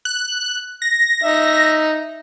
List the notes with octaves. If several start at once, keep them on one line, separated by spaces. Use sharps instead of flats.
F#6
A#6
D#4 E5